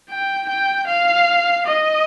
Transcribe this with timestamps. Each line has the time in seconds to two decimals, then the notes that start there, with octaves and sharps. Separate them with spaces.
0.10 G5
0.49 G5
0.88 F5
1.66 D#5